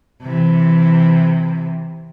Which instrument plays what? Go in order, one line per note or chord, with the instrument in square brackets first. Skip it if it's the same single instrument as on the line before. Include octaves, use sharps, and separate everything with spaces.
[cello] C3 E3